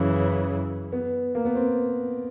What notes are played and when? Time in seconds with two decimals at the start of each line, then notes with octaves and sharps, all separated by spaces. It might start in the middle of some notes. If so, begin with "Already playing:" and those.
Already playing: F#2 C#3 E3 C#4
0.92 B3
1.35 A#3
1.45 B3
1.55 C4